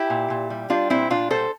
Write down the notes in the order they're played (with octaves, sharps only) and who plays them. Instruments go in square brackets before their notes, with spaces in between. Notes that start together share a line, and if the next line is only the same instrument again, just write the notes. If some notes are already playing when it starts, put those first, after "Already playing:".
Already playing: [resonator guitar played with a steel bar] E4 G4
A#2
A#2
G3
G3 D4 F4
A#2 C4 E4
A#2 D4 F4
G3 A4 C5